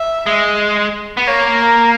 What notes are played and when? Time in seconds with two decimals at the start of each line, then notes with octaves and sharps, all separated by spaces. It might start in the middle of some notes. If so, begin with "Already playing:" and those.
Already playing: E5
0.26 G#3
1.17 B3
1.27 A#3 C#5
1.61 A#4